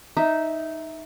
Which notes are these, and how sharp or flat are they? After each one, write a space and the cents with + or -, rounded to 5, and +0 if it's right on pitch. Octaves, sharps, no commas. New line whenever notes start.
D#4 +0 E5 -10